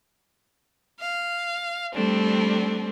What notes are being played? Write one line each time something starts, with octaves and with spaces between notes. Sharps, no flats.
F5
G3 A3 C4 D4